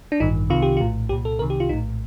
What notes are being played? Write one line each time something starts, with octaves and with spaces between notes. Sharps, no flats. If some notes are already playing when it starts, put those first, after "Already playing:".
D4
A1 G2 D#3 D#4
C2 C3 D#3 F4
G4
A#1 A2 F4
C2 A#2 G4
A4
C2 C3 D#3 A#4
G4
F4
A#1 A2 D#4